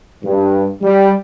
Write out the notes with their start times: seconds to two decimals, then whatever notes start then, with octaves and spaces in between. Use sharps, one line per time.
0.23 G2
0.82 G3